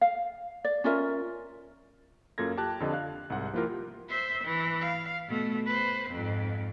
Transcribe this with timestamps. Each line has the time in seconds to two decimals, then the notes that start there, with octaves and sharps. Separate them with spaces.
0.01 F5
0.64 D5
0.84 C#4 F4 A#4 E5
2.38 F#2 A#3 F4 A4 G#6 A#6
2.57 G4 A5 F#6
2.80 F2 D3 D#5
2.92 F5 F#6
3.30 C2 G#2 F#5
3.53 F3 A#3 E4 F4 G4 A#4
4.09 C5 E5
4.44 E3
4.82 F5
5.28 B2 A3
5.66 B4 C5
6.11 F2 G#2